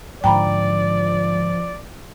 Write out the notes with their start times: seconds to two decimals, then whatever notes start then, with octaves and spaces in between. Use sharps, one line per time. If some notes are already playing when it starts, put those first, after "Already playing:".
0.24 G#2 D3 F3 D5 G5 A#5 B5